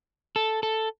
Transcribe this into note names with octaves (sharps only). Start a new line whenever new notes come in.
A4
A4